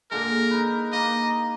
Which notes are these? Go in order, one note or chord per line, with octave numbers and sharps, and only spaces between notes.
A#2 D3 G#3 A#4
D#4 B4
A#3 D#5